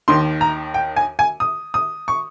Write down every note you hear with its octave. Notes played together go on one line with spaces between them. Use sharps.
D#2 D#3 C6
A#5
G5
G#5
G#5
D#6
D#6
C#6